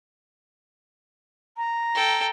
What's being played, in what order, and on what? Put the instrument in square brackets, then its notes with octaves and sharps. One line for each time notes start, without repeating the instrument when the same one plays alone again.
[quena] A#5
[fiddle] A4 G5